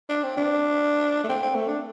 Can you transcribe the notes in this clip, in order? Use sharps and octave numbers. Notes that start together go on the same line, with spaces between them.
D4
C4
D4
A3
C4
C4
A3
D4